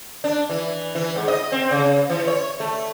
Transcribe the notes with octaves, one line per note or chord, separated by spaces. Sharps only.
D4
E3
E3
G#2
D#5
C4
C#3
E3
C#5
A3